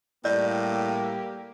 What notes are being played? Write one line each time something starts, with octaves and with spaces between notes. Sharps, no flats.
A2 G3 A#3 G4 D5